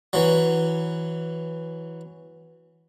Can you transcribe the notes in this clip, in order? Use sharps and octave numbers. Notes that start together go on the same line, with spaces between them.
E3 F#3